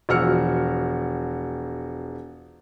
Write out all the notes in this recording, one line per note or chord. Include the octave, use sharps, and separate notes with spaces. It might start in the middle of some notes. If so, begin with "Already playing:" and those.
E1 F3 F#4 E6 F6 C#7